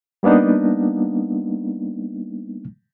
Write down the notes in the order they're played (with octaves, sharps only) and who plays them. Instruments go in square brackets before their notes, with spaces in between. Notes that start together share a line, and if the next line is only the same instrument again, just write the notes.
[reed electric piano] G3 A#3 B3 D4 D#4